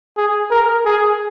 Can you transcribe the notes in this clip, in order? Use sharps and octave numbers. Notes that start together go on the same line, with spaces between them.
G#4
A#4
G#4